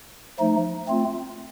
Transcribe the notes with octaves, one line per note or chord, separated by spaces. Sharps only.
F3 A3 D#4
A3 C4 F4